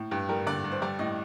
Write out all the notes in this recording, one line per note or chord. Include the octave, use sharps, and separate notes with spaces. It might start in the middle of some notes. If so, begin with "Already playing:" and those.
Already playing: A2
G2 G4
G3 A#4
D3 D5
G2
C5
G3 D5
A2 D#5